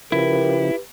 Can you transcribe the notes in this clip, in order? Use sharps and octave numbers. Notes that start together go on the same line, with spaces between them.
C#3 F3 E4 G4 A#4 B4